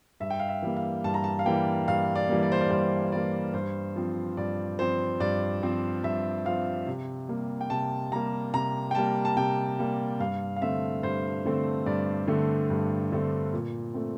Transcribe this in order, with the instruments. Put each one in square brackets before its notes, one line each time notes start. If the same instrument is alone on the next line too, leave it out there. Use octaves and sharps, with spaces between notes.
[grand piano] G2 E5
G5
F5
E5
E3 G3 A#3
F5
G2 A5
A#5
A5
F5
E3 G3 A#3 G5
G2 F5
D5
E3 G3 A#3
D5
C5
D5
G2 C5
E3 G3 A#3 D5
G2 C5
F3 C4
G2 D5
F3 C4 C5
G2 D5
F3 C4
G2 E5
F3 C4 F5
C3
G3 A#3
G5
C3 A5
G3 A#3 A#5
C3 A#5
G5
G3 A#3 A5
A5
C3 G5
G3 A#3
G2 F5
F5
D3 A3 C4 E5
G2 C5
D3 A3 C4
G2 D5
D3 A3 C4
G2
D3 A3 C4
A#2
A3 C4